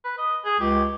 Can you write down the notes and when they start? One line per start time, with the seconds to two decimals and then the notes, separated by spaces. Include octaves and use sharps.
0.05 B4
0.18 D#5
0.45 G#4
0.60 C#2 G4